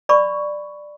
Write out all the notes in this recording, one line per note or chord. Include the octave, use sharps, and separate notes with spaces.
D5 B5 C#6